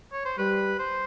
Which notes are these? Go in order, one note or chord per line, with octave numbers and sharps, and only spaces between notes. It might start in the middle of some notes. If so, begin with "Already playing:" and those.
C#5
C5
G3 B4
C5